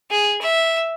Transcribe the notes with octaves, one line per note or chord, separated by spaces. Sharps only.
G#4
E5